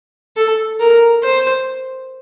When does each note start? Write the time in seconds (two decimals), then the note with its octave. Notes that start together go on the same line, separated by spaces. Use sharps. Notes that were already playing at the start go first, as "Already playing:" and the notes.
0.37 A4
0.80 A#4
1.23 C5